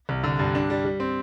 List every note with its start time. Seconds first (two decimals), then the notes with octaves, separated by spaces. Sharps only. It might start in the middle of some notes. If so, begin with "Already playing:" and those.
0.09 C2
0.24 D3
0.39 G2
0.55 D4
0.70 G3
0.85 G3
1.00 C4